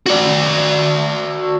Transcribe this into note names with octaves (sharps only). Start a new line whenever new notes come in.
F#4 D5